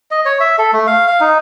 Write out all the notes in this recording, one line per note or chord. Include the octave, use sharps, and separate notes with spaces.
D#5
C#5
E5
A4
A3
F5
F5
D#4